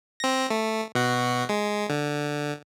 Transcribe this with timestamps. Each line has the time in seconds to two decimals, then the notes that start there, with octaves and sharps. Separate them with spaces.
0.20 C4 A#6
0.50 A3
0.95 B2 F#4
1.49 G#3
1.90 D3